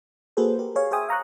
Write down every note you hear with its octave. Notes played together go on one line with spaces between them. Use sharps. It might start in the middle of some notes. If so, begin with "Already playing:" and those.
A#3 F#4 G#4 A4 B4 C5
G4 A#4
G#4 C#5 F5
G#4 C5 E5 G5 G#5 D#6
F5 A#5 C#6 F#6